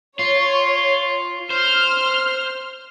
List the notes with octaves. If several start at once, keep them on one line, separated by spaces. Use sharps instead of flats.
F4 C#5
C5 F6